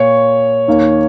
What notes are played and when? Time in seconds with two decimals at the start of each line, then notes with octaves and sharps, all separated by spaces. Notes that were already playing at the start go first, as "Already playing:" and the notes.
Already playing: A#2 A#3 C#5 C#6
0.68 D#2 D#3 A#3